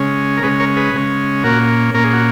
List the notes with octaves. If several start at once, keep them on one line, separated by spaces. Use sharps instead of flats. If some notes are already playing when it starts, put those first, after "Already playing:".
Already playing: C#3 G#3 C#4
A#4
C#3 G#3 C#4 G#4 B4
A#4 C#5
G#4 B4
C#3 G#3 C#4
A#2 A#3 C#4 F#4 A#4
A#2 A#3 C#4 A#4
G#4
F#4